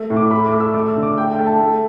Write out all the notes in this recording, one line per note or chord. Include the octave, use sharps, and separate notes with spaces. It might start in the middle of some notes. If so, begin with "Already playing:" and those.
Already playing: A3
A2
D6
A3 B5
D6
A3
E6
A3 D6
E6
D3
D6
A3 G5
G5
A3
A5
A3